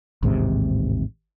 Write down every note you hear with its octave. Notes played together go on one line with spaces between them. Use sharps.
A1 D#2 G#2 C3